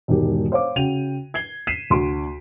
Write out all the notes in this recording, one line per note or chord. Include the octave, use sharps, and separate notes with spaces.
E1 G#2 D#3 G4
C5 C#5 F5 D6
C#3 F#4 G5 D#7 F7
G#6 C7 G7
B6 C7 D#7 E7
D2 C6 D7